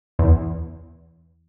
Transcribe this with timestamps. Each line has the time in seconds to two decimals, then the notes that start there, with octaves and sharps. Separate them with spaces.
0.19 E2